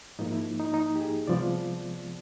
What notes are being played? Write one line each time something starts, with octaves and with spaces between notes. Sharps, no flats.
G#2 F3 A#3 D#4
E4
D#4
D#4
G4
G#4
C2 C3 F3 G#3 B3 D5